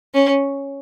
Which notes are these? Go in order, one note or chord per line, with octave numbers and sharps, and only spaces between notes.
C#4